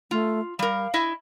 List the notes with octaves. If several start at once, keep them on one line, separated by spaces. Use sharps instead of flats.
A3 F4
G3 A#4 F5
E4 D#5 E5